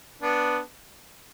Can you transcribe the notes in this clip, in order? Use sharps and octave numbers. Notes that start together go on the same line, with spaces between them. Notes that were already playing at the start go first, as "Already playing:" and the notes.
B3 D4